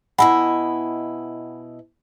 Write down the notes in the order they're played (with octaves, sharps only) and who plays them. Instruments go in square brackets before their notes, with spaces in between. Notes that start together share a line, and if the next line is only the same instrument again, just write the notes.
[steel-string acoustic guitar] B2 E4 D#5 [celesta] F#5 G#5 B5